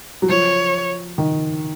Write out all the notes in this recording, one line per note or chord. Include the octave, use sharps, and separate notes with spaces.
F#3
F3 C#5
D#3